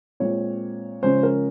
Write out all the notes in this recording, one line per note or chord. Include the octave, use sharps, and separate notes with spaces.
A#2 G#3 C4 C#5
C#3 F3 G#3 C#4 C5
A#4